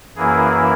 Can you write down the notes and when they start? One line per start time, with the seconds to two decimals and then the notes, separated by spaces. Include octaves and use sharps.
0.16 F#2 E3 A#3 E4 G#4